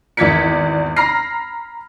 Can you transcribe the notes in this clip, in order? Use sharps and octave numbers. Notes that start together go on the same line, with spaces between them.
G#1 E2 D5 G#6 B6 C#7
A#5 B5 F6 A#6 C7